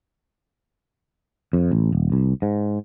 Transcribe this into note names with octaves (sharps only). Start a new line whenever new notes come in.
F2
A1
D#1
C2
G#2